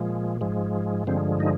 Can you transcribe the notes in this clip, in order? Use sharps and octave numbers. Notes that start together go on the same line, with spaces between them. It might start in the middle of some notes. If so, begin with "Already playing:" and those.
Already playing: A#2 F3 G#3
G#2 F3 G#3
G2 D3 F3 G#3 C4
D#4